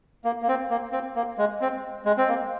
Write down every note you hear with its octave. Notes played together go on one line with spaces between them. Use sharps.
A#3
A#3
C4
A#3
C4
A#3
G#3
C4
G#3
C4
A#3